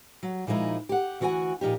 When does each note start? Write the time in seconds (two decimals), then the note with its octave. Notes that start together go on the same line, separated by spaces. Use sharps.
0.23 F#3
0.47 A#2 F3 G#3 D#4 E4
0.89 G4 F#5
1.20 D2 E3 F#4 B4 F#5 G#5
1.61 A#2 F3 D#4 G4